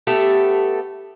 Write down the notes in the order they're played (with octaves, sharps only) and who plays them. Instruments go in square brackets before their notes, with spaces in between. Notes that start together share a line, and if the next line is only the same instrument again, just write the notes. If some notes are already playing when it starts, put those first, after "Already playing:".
[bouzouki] A3 B3 G4 A4